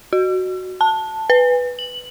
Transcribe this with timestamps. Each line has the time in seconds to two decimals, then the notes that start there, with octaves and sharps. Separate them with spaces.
0.13 F#4
0.81 A5
1.30 B4
1.79 F#7